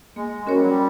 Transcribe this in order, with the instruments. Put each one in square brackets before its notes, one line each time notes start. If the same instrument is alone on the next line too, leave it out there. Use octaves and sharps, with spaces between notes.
[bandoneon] G#3 [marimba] A#3
[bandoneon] G#3 [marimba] C#4 F#4 A#4 C#5
[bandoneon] G3
F#3
G3